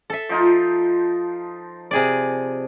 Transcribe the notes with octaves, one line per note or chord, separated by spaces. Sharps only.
A4 E5
F3 D#4 F4
C3 G#4 D5